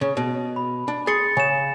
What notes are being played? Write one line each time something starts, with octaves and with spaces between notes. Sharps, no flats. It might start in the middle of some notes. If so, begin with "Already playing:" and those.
C#3
B2
B5
D4
G#4 C6 A6 C#7
C#3 G#5 E7